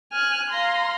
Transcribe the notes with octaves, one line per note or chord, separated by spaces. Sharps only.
G#5 F6 F#6
F5 A#5 C6